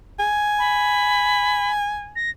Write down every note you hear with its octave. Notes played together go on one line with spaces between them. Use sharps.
G#5
B5
A#6